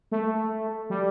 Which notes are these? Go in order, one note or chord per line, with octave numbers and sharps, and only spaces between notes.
A3
G3